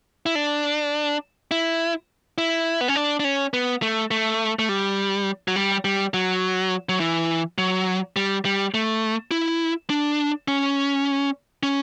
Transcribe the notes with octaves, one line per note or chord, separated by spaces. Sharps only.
E4
D4
E4
E4
B3
C#4
D4
D4
C#4
B3
A3
A3
A3
G3
F#3
G3
G3
F#3
F#3
E3
F#3
G3
G3
A3
E4
D4
C#4
C#4